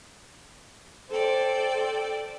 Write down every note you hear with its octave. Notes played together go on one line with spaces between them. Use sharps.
A4 C5 D5 G5